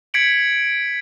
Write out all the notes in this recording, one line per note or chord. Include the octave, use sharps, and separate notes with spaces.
G#6 B6 C#7 D7 F#7